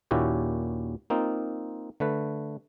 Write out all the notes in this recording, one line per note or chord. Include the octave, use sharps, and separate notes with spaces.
D#2 A#2 C#4 E4 F#4 G4
A#3 C4 D#4 F4
D3 A3 B4